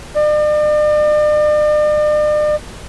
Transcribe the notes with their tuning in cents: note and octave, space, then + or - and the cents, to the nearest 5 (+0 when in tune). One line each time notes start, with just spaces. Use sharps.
D5 +45